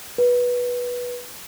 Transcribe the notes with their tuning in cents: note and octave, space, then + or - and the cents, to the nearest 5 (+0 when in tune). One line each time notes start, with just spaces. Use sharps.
B4 -15